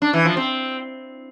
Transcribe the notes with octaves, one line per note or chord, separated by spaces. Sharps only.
D4
E3
F3
C4